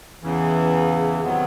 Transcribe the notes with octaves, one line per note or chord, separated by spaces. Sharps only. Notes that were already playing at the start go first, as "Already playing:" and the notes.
E2 C#3 E3
C3 D#3 F#3 B3